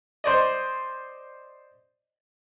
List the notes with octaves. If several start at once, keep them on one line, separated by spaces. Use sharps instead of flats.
C5 D5 D#5